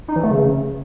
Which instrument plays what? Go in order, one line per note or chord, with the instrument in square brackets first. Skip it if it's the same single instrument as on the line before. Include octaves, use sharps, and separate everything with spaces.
[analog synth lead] D#4
E3
A3
C#3